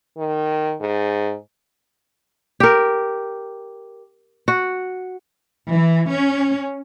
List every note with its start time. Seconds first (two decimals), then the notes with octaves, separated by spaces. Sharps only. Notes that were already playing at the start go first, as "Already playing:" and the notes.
0.18 D#3
0.81 G#2
2.60 G4 A#4
4.48 F#4
5.70 E3
6.10 C#4